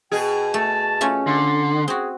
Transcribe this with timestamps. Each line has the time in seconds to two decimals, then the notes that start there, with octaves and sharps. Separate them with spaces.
0.12 B2 G#4 G5
0.54 A3 A5
1.01 A3 C#4 F4
1.27 D3 C6
1.88 C4 F#4 G#4